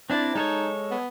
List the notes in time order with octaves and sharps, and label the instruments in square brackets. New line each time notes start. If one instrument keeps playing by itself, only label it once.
[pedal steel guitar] C4 E4 D5 [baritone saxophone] D4
[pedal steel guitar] G#3 A4 C#5 [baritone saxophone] D#4
[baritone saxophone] B3